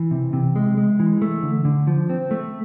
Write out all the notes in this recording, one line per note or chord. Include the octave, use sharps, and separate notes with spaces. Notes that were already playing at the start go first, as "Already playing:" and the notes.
Already playing: E3
C3
C3
G#3
G#3
E3
A3
D3
D3
F3
C4
A3